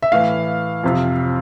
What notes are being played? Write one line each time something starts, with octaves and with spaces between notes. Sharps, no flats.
E5
A2 E3 F5
F2 C3 F3